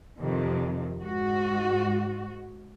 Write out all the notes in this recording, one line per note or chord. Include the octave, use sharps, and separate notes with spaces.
F2 C3 D#3
G#2 F#4